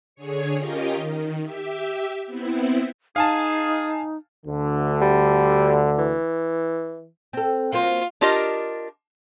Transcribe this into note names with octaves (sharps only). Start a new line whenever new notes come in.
D3 G#4 C#5 C#7
C#4 F4 G4 A#4 D#5
D#3
G4 E5
B3 C4 E4
D#4 G#4 F5 G#5 A5
D2 D3
G3
E3
C4 A4
F#3 A#3 F4 C5
D4 F4 G4 A#4 D#5